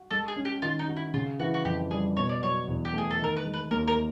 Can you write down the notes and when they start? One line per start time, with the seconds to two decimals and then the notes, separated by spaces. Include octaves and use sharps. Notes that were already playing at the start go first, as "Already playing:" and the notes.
Already playing: F#4
0.11 G#3 A4
0.28 G#4
0.36 C#4
0.45 G4
0.62 D#3 F4
0.79 D#4
0.88 F#4
0.96 E4
1.14 C#3 F4
1.39 E3 F#4
1.54 F#4
1.65 F2 G4
1.91 G3 G#4
2.17 B2 C#5
2.29 D5
2.42 F#3 C#5
2.68 E2
2.85 G4
2.94 A3 G#4
3.11 A4
3.19 D#3 A#4
3.37 B4
3.45 G#3
3.54 B4
3.71 D#2 A#4
3.88 A#4